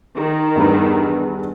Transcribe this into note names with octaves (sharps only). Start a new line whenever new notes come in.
D#3
E2 G2 B4